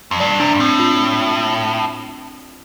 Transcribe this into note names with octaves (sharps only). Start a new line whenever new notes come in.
F2
G2 D5
C3 D4
G2
A2 C4
F4